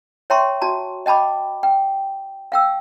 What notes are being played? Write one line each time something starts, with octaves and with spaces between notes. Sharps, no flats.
C#5 E5 G5 A#5 C6 C#6
F#4 A5 A#5
D#5 G5 A5 B5 D6
G5
F5 G5 E6